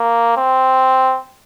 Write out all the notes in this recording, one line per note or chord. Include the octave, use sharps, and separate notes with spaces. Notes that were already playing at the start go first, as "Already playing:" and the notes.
Already playing: A#3
C4